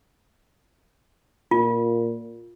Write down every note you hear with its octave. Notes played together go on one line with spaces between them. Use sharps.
A#2 F4